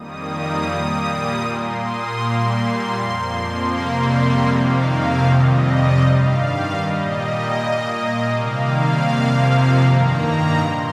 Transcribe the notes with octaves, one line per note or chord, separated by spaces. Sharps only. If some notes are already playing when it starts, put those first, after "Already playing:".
Already playing: F2 D#3 G3 A#3 D#6
A#2 G3 A#3 D#6
A#2 A#3 C6
D#6
A#2 G3 A#3 C6
F2 F3 A#3
F2 C3 G3 A#3
F2 C3 D#3 A#3 F5
F2 C3 G3 D#5
G2 D#3 G3 F5
A#2 G3 A#3 D#5
A#2 A#3
C3 D#3 G3 A#3 F5
F2 C3 F3 A#3
G2 D#3 A#3 A#5
A#2 A#3 C6